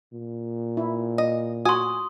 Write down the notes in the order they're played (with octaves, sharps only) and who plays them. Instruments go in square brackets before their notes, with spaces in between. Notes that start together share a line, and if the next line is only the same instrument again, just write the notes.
[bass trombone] A#2
[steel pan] E4
[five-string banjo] D#5
[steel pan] F#4 [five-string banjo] G#5 [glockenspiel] C6 D#6